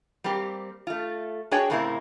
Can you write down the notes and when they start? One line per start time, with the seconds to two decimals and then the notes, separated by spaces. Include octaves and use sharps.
0.24 G3 A#3 C4 G4
0.87 A3 F4
1.51 D4 F#4 G#4 C#5 G5
1.70 A2 C#3 A#3 C4 E4